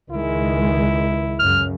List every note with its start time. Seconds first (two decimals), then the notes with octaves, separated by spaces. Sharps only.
0.11 C#2 D#3 G#3 E4
1.39 F#2 C#3 F6